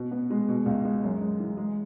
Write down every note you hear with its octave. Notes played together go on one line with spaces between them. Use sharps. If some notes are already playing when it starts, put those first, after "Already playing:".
Already playing: B2
B3
G#3
B2
C#2
G#3
F#2
G#3
E3
G#3